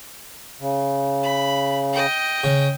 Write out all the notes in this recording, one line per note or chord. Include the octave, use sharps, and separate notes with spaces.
C#3
B5
D#5 G5
C#3